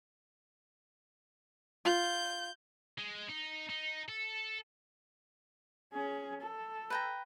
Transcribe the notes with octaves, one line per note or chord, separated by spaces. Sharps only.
F4 G6
G#3
D#4
D#4
A4
C#4 G#4
A4
B4 G5 A#5